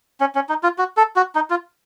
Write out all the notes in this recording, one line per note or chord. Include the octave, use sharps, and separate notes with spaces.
C#4
C#4
D#4
F4
F#4
A4
F#4
D#4
F4